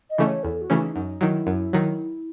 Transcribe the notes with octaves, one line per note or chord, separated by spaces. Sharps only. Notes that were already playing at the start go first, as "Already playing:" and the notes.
D#5
C#3 E3 A3 C#4
C#5
E2 A4
F#4
C#3 E3 A3 C#4
D#4
F#2 D#4
D#3 F#3 E4
F#2
D#3 F#3